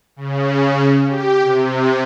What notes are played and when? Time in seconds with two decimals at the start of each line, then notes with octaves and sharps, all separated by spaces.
0.16 C#3
1.07 G4
1.42 C3